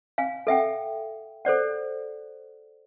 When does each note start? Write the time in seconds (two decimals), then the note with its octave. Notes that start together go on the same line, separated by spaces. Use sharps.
0.18 F5 G#5
0.47 A4 E5 F#5 G5
1.45 A4 C5 D5 F#5